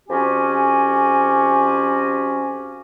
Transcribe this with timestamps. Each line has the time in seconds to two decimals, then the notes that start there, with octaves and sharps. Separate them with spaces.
0.08 F2 C#4 F#4 G4 G#5